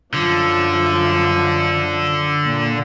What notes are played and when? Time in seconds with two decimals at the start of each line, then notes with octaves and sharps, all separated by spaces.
0.13 F#2 D3 F3
2.45 A#2